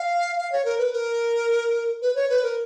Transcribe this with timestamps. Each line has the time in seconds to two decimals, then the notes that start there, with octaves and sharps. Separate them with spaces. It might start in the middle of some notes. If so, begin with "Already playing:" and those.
Already playing: F5
0.38 F5
0.52 C#5
0.65 A#4
0.78 B4
0.93 A#4
2.02 B4
2.15 C#5
2.30 B4
2.43 A#4